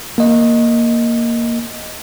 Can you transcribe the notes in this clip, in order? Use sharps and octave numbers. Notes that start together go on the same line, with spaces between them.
A#3 D#5